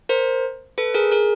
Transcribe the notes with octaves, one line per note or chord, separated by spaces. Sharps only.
A#4 C5
A4 B4
G#4 A#4
G#4 A#4